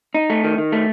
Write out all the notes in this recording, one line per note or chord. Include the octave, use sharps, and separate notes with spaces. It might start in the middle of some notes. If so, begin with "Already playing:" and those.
D#4
A3
D#3
D#3
A3